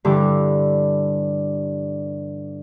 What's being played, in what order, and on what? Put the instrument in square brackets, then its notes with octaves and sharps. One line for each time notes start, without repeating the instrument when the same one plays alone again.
[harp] G2 D3 E3 D6